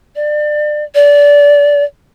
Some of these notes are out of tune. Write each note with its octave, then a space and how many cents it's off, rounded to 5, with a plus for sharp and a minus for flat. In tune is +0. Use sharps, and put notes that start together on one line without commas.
D5 +30
D5 -20